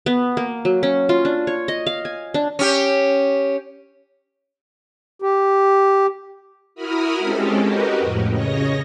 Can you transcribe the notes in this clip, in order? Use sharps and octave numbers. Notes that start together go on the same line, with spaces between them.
B3
A#3
F#3
C#4
F4
D4
C#5
D#5
F5
G#5
D4
C#4 G4
G4
E4 F#4 A#4 B5 D#6 F6
G#3 C4 C#4 G4 A4
F#4 G4 A#4 B4 D#5
F2 A2
C#3 C#5 D#5 A#6